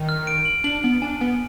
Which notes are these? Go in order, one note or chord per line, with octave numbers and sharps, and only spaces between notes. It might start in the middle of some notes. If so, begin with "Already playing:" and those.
Already playing: D#3
F6
D7
F#7
D4 F#7
B3 F#7
D4 G#5
B3 G#5